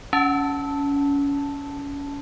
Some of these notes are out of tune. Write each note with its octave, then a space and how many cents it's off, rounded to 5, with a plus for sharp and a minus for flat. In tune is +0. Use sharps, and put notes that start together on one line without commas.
C#4 +25 A5 +0